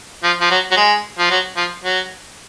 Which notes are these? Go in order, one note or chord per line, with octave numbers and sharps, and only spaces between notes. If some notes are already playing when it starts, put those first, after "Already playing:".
F3
F3
F#3
F#3
G#3
F3
F#3
F3
F#3